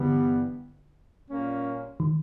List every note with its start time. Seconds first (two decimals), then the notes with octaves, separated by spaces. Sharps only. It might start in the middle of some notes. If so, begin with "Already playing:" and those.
Already playing: G2 D3 E3 G3 B3
1.30 A#2 G3 A#3 C#4
2.00 D#3